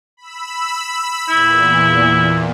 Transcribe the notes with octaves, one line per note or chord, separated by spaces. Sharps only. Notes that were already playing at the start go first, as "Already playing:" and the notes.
B5 E6
E2 A#2 E4